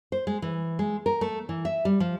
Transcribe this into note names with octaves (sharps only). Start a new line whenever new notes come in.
C5
G#3
E3
G#3
A#4
A3
E3
E5
G3
F3